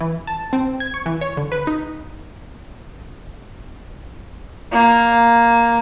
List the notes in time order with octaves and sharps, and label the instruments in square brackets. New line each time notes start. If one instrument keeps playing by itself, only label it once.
[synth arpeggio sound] E3
A5
C4
G#6
C#6
E3
C#5
D3
B4
D#4
[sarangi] A#3